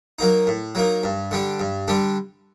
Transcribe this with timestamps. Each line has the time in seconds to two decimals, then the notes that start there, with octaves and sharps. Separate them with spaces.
0.19 F#3 A#3 D#4
0.47 A2
0.75 F#3 A#3 D#4
1.04 G2
1.31 D3 G3 D4
1.60 G2
1.88 D3 G3 D4